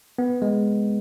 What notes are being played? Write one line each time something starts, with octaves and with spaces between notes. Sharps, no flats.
B3
G#3